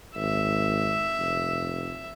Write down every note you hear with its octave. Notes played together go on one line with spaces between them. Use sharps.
G#1 E5
F1